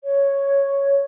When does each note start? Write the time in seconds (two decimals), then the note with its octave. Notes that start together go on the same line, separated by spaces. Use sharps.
0.04 C#5